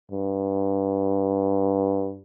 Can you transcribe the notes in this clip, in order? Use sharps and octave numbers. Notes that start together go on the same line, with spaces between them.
G2